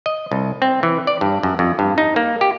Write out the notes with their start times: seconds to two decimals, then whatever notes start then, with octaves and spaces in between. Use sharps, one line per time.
0.06 D#5
0.32 C2
0.62 C4
0.83 E3
1.07 D5
1.21 G2
1.43 F#2
1.59 F2
1.79 G2
1.98 D#4
2.16 A#3
2.41 G4